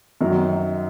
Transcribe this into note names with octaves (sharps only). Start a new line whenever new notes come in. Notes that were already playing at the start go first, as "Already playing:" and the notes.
F#2 D#3 F#3